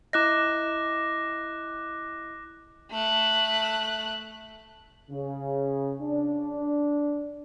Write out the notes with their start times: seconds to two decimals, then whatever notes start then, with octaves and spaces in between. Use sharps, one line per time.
0.13 E4 D#5 D6 F#6 A#6
2.91 A3 F#6
5.10 C#3
6.01 D4